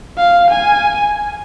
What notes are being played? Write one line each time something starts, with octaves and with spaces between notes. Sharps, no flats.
F5
G#5